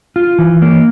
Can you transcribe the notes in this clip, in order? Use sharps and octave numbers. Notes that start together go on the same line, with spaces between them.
F4
E3
A#3